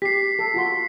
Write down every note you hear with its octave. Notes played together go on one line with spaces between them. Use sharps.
G4 B6 C7
A4
F4 F#4 C6